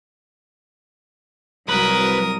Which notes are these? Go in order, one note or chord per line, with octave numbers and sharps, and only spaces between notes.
C2 F#3 A#4 B4 D#6